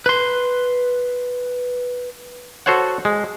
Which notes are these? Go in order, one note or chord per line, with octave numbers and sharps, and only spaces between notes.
B4 C6
F#4 A4 C5 C#5 F#5
G#3